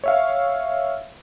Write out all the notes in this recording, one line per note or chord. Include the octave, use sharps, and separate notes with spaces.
C#5 E5 F5